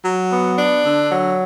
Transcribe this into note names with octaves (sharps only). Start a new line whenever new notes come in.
F#3
B3
D4
D3
F#3